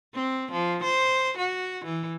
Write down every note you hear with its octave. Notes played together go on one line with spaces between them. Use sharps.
C4
F3
C5
F#4
E3